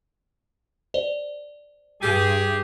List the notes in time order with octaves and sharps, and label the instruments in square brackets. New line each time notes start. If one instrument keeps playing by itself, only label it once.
[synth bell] C5 D5
[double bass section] G2 [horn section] G4 G#4